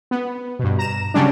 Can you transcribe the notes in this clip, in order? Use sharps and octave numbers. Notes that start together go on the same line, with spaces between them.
B3
G2 B2
A#5 E7
C#3 F#3 G3 C#4 D4